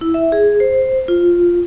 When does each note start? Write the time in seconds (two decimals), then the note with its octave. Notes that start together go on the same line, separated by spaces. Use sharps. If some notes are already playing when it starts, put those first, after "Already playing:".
0.01 E4
0.14 E5
0.32 G#4
0.60 C5
1.08 F4